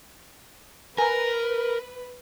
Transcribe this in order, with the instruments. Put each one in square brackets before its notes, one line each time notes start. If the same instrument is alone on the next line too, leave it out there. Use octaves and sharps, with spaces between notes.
[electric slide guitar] A#4 [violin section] B4 [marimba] G#5 A#5